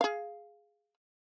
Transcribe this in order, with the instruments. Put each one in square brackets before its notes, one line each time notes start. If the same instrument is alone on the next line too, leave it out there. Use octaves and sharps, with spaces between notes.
[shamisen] G#4 F5